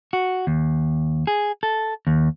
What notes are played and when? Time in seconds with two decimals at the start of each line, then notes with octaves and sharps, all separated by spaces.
0.13 F#4
0.47 D#2
1.27 G#4
1.63 A4
2.07 D#2